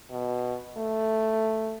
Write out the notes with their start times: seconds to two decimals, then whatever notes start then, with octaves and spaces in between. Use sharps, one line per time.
0.11 B2
0.78 A3